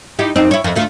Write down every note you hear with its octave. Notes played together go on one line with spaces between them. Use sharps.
D#4 E4 G4
F#2 C4 D#4
E4 C#5
F2
D2 A3 F4